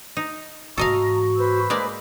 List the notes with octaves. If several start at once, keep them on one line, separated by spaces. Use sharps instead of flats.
D#4
G#2 E3 F#4 A4 D#5 F5 A#5
B4 C5 E6
G#3 A#3 D5